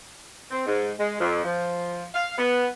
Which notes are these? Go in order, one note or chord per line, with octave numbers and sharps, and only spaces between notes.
C4
G#2
G#3
F2
F3
F5
B3